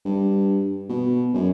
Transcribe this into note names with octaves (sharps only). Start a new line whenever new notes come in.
G2
B2
F#2